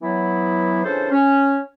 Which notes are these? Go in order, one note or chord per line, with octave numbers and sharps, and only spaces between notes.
E3 F#3 B3 E4
C#3 E3 D4 F4 A4 C5
C#4